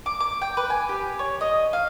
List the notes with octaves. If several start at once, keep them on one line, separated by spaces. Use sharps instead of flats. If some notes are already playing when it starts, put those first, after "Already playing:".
D6
D6
G5
B4
G#5
G4
C#5
D#5
F5